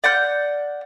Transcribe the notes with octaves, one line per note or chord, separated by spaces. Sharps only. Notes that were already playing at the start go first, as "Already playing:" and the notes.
D5 F#5 F6 G6